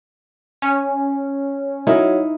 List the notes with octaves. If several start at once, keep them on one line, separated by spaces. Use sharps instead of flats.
C#4
F#3 D#4 E4 A#4